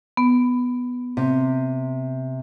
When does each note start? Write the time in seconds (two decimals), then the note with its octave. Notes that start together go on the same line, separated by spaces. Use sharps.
0.17 B3
1.17 C3